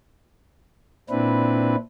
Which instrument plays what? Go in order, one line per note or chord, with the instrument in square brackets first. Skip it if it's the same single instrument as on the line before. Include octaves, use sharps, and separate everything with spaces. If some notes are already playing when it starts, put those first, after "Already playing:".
[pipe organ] A#2 C4 D4 E4 B4